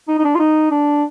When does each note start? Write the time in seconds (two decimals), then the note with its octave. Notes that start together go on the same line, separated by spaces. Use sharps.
0.08 D#4
0.18 D#4
0.24 D4
0.35 F4
0.39 D#4
0.71 D4